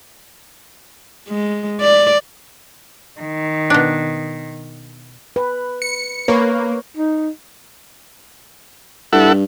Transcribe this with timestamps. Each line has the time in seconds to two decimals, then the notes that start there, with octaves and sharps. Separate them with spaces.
1.28 G#3
1.81 D5
3.21 D#3
3.70 B2 D4
5.36 B4
5.82 C#7
6.28 A#3 B4 C#5
6.97 D#4
9.13 G2 E4 A4 F#5